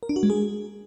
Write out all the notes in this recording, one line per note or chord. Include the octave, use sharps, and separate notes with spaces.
A#4
D4
F#4
G#3
G#4